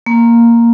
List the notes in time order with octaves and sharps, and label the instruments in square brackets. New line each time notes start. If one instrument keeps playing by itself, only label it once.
[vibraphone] A#3